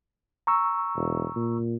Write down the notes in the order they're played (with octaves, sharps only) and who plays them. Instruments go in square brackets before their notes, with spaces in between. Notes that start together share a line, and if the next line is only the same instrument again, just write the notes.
[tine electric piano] A#5 C#6 E6
[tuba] E1
A#2